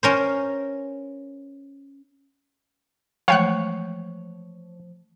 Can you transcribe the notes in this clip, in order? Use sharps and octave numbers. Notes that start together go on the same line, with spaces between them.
C#4 A#4 C5
E3 F3 G#3 A3 C#5 F5 G5 F#6